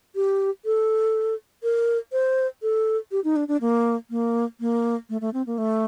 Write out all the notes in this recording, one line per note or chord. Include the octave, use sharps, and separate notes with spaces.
G4
A4
A#4
C5
A4
G4
D#4
D4
D4
A#3
A#3
A#3
A3
A3
C4
A#3
A3